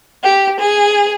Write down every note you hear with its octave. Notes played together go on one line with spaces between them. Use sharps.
G4
G#4